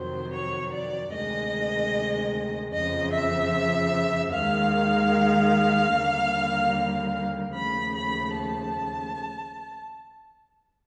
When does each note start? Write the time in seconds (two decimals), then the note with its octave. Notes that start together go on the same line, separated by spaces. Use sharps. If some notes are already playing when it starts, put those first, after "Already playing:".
Already playing: F2 C3 D#3 F#3 C5
0.33 C#5
0.73 D5
1.13 D2 C3 D#3 G#3 D#5
2.74 F2 C#3 F3 D#5
3.14 E5
4.34 D#2 D#3 G#3 F5
5.94 D#2 D3 G3 A#3
7.54 D#2 C#3 F3 A3 B5
7.95 B5
8.35 A5